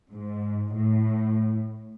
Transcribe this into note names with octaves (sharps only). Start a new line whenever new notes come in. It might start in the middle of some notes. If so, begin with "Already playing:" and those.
G#2
A2